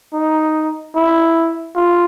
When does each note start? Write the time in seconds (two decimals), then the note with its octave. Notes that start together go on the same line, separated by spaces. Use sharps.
0.13 D#4
0.95 E4
1.76 F4